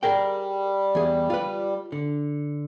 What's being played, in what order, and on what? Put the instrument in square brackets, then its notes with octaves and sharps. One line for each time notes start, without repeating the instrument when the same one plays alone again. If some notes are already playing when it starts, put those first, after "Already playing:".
[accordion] G3 [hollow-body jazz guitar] G#4 A#4 G5
[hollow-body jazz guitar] E2 G#4
F4 B4
D3